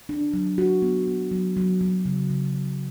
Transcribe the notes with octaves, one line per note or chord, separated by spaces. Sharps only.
D4
F#3
F#4
B3
B3
F#3
F#3
F#3
C#3
C#3
F#3